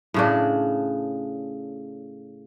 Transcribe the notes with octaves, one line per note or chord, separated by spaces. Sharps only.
A2 C#3 D4